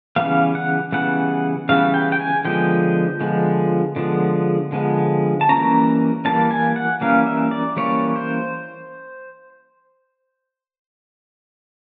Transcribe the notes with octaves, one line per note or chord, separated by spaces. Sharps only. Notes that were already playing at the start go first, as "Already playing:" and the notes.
C#3 E3 G3 B3 F5
F#5
C#3 E3 G3 B3 F#5
C#3 E3 G3 B3 F5
G5
G5
G#5
D3 F3 G#3 B3 G5
D3 F3 G#3 B3
D3 F3 G#3 B3
D3 F3 G#3 B3
A5
E3 G3 A#3 C#4 A#5
E3 G3 A#3 C#4 A5
G#5
F#5
E3 G3 A#3 C#4 F5
E5
D5
E3 G3 A#3 C#4 C#5
C5